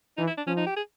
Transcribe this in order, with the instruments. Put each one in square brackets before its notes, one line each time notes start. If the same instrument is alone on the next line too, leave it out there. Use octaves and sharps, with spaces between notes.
[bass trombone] E3 [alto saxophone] D#4
[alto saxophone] E4
D4
[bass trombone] F3 [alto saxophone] C#4
[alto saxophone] D#4
G4
G#4